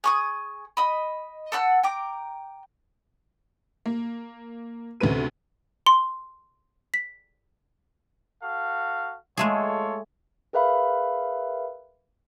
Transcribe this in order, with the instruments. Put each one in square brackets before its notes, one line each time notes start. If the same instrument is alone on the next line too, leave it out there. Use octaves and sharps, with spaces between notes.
[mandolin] G#4 C#6 D#6
D#5 B5
A4 F#5 E6 F#6
G5 A#5 D6
[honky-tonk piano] A#3
D2 C3 C#4 B4 D#7
[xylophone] C6
B6
[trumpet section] F#4 A4 F5
[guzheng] G#3 A3 G#4 [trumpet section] F4 A4 C#5
[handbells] G#4 A#4 B4 E5 F5 B5